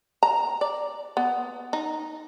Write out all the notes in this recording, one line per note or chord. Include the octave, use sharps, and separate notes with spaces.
A#5
D5
B3
D#4